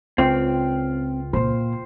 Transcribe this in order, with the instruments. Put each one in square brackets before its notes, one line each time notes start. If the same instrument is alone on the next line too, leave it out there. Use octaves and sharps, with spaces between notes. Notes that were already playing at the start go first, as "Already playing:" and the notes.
[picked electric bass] C#2 [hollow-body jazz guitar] C4 [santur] F4 G5
[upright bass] A#2 A#3 [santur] C5